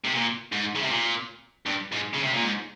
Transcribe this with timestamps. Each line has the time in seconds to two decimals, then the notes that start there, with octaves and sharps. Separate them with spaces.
0.04 C3
0.14 A#2
0.52 G#2
0.75 C#3
0.82 C3
0.90 A#2
1.66 G2
1.92 G#2
2.13 C#3
2.23 C3
2.33 A#2
2.43 G#2